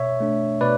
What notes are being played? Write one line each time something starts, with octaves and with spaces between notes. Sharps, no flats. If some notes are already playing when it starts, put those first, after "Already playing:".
Already playing: B2 C#5 E5
A3 D4
B2 B4 D5